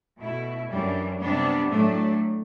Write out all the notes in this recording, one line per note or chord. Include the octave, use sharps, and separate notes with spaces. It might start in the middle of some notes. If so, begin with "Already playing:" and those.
B2 A3 E4
F#2 E3 G3 D4
C3 G3 B3 D4
A2 F#3 A3 D4